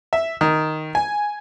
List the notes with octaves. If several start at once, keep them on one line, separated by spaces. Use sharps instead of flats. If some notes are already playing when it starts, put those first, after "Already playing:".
E5
D#3
G#5